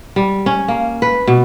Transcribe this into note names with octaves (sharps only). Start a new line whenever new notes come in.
G3
C#4
A#3
B4
B2